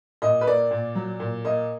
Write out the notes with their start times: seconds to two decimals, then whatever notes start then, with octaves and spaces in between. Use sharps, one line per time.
0.22 A#2 D#5
0.41 B4
0.47 A#3 D5
0.71 A#2
0.95 F#3
1.20 A#2
1.44 A#3 D#5